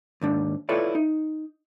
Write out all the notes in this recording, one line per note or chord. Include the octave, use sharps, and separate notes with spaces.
D#2 G#2 D4
E4 F4 A4 B4 C#5 D5
D#4